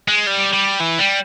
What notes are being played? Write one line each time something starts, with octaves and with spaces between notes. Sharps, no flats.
G#3
G3
G3
E3
G3